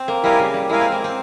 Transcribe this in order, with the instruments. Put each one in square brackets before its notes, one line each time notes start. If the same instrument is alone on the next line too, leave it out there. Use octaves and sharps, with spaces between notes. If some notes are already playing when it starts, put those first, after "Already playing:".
Already playing: [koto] C4
A#3
[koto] G3 [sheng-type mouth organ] E4 A#4 F5 G#5
[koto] C#3
G3
[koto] G#3 [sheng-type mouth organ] E4 A#4 F5 G#5
[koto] C4
A#3
C4